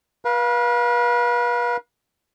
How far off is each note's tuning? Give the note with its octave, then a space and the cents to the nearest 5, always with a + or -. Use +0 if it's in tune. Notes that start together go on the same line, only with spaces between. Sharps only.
B4 -35 F5 +10